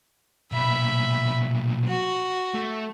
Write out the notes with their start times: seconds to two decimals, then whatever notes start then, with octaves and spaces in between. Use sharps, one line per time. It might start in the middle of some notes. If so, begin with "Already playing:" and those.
0.52 B1 A#2 E5 B5
1.88 F#4
2.55 A3